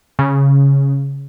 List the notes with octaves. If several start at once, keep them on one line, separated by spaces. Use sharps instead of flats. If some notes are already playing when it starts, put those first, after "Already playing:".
C#3